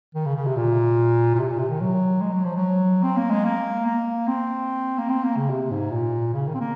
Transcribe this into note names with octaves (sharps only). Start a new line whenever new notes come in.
D#3
C#3
C#3
C3
A#2
A#2
C3
A#2
C3
D#3
F#3
G#3
F#3
F3
F#3
C4
A#3
G#3
A#3
A#3
C4
A#3
C4
A#3
C#3
C3
G#2
A#2
C#3
D#3
C4
A#3